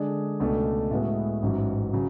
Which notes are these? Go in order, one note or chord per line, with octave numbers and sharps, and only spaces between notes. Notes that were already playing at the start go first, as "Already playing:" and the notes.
Already playing: D3 G#3 D4 G#4
C#2 B2 A3 D4
A2 G#3 B3 F#4
A1 G#2 F#3
C#3 F#3